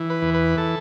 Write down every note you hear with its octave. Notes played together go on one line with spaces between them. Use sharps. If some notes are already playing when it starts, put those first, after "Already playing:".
Already playing: E3
B4
E2
B4
A4